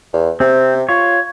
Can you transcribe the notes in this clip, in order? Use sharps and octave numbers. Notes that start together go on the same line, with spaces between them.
E2
C3 C4
F4 C#5